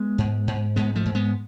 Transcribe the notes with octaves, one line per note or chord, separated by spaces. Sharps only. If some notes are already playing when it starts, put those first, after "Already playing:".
Already playing: G#3 B3
G#2
G#2
G#2 G#3 B3
F3 A3
G#2
G#3 B3